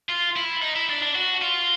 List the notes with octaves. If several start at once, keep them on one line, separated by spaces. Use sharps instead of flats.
F4
E4
D#4
E4
D4
D4
F#4
F4